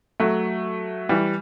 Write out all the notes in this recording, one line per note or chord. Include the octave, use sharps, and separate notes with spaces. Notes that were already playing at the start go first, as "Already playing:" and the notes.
F#3 A3
E3 G3